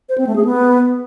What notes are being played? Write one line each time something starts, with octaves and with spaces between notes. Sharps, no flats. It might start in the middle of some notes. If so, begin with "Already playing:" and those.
C5
C4
A3
G#4
B3